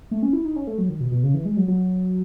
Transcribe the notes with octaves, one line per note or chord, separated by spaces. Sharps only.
A3
C#4
E4
D#4
C#4
A3
F#3
D#3
B2
B2
C#3
E3
G#3
F#3
F#3